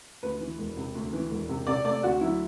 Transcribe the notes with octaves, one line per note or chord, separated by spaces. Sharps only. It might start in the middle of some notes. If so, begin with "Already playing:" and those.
D2 B4
E3
E1
C3
D2
E3
E1
C3
C3 D5
A3 D5
D2 F#4
F#3 E4